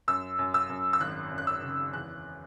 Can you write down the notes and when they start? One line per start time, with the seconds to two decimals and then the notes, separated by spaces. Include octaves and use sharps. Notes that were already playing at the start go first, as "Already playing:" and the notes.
0.08 F#2 E6
0.39 F#2
0.54 E6
0.70 F#2
0.93 E6
1.00 G#1 F#6
1.31 F#2
1.38 F#6
1.47 E6
1.63 C#3
1.93 E2 F#6